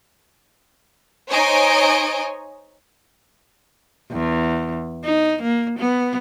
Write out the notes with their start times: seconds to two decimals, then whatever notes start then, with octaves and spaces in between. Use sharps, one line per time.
1.30 D#4 C5 C#5 D#5 G#5 D7
4.11 E2
5.04 D#4
5.42 A#3
5.79 B3